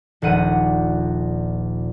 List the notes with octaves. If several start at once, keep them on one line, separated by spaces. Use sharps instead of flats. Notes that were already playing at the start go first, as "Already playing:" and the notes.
D#1 A#1 F#5 D#7